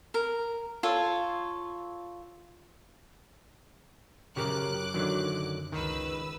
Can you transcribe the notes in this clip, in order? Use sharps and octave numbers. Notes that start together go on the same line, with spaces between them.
A#4
F4 A4 C#5
F#2 C#3 G4 A#4 D6 F#6
D3 D#3 F#3
C#2 D#3 B4 E6